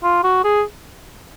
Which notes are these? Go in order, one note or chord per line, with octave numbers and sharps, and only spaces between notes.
F4
F#4
G#4